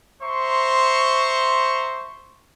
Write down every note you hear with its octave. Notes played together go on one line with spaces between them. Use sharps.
C5 E5 A#5 C6 C#6